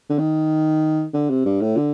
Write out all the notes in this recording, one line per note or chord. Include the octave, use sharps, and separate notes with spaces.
D3
D#3
D3
C3
G2
A2
D3